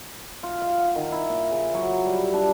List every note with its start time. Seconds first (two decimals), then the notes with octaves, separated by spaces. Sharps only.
0.43 F4
0.62 F5
0.78 F#5
0.96 D#3
1.12 E4
1.29 A#2
1.51 C#3
1.74 F#3
2.06 G3
2.33 D4